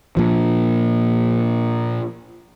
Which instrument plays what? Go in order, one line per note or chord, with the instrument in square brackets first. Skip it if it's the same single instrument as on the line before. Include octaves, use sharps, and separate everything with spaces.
[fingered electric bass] A#2 F3